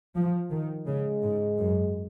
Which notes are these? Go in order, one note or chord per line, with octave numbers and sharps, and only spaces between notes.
F3
D#3
C#3 G#3
G#2
F#2